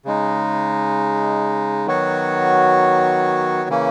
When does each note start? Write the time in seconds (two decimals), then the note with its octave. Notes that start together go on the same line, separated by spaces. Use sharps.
0.05 C#3 G#3 D#4
1.86 D#3 F#3 B3 F#4 C#5
3.70 C#3 E3 A#3 C#4